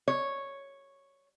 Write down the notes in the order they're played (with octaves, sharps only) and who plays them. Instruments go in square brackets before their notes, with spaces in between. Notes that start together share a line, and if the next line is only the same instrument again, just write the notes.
[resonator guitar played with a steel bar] C#5